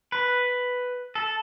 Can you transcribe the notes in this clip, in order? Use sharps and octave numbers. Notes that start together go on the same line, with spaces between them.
B4
A4